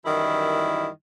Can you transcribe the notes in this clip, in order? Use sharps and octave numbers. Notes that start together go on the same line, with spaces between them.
F#2 D#3 E3 G3 E4